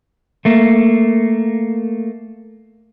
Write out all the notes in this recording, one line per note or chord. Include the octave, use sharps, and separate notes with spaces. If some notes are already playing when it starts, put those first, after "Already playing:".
A3 A#3